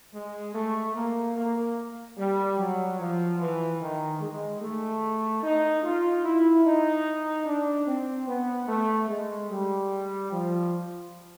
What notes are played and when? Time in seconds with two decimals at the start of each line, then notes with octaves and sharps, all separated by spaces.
0.14 G#3
0.55 A3
0.95 A#3
1.36 A#3
2.17 G3
2.58 F#3
2.99 F3
3.39 E3
3.80 D#3
4.21 G#3
4.61 A3
5.43 D#4
5.83 F4
6.24 E4
6.65 D#4
7.46 D4
7.87 C4
8.27 B3
8.68 A3
9.08 G#3
9.50 G3
10.31 F3